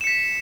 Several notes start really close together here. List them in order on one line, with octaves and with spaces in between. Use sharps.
E7 C#7 B6